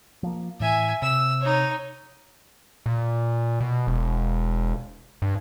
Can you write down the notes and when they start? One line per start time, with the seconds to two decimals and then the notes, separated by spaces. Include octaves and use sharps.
0.23 F3 A#3
0.60 A2 E3 E5 G#5
1.02 C3 E6
1.40 D#4 C#5
2.86 A#2
3.60 B2
3.87 E1
5.22 G2